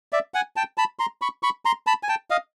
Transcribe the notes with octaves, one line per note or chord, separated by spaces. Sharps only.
D5 E5
F#5 G#5
G5 A5
A5 B5
A#5 C6
B5 C#6
B5 C#6
A#5 C6
A5 B5
G#5
G5 A5
D#5 F5